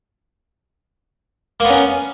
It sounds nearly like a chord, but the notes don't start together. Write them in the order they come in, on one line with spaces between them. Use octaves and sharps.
A#3 B3 C#4